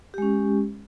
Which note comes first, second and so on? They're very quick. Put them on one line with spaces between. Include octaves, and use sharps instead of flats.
G4 G#3 C#4